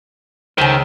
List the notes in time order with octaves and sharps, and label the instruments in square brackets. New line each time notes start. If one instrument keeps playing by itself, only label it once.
[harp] C#2 E6 B6 [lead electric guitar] D#3 [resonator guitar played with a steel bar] C5 A5